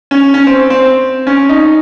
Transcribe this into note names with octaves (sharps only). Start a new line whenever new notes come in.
C#4
C#4
C4
C4
C#4
D#4